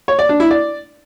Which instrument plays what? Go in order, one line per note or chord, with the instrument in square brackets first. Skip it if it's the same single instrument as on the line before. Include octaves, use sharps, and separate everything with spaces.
[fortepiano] C#5
D5
D4
E4
D5